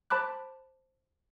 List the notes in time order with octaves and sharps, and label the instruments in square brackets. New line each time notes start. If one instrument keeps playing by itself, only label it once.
[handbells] C5 A5 B5 D6 F#6